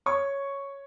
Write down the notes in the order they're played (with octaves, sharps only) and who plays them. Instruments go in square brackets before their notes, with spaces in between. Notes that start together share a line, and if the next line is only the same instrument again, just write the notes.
[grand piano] C#5 C#6